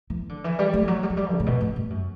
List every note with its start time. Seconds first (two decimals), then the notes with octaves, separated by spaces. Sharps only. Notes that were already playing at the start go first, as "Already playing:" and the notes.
0.10 E3
0.29 D3
0.44 E3
0.59 G3
0.73 A3
0.83 E3
0.88 F#3
1.03 G3
1.10 F#3
1.17 G3
1.32 C#3
1.40 A2
1.46 B2
1.61 A2
1.76 G2
1.90 F#2